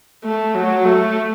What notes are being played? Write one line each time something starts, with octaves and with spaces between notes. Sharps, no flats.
A3
F#3
A3